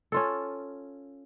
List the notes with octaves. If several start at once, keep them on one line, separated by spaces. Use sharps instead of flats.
C#4 F4 A4